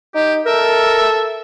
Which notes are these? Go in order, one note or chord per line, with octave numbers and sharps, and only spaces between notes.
D#4 G4
A4 A#4 E5